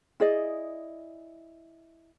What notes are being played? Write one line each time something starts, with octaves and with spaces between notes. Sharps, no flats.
E4 G#4 D5 D#5